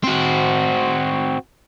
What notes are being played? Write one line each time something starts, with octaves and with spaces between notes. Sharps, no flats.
C4 F#4